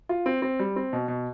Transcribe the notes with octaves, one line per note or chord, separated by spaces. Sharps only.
F4
C4
C4
G3
C4
B2
B2